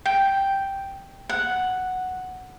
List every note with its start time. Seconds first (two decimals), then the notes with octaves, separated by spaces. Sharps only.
0.06 G5
1.29 F#5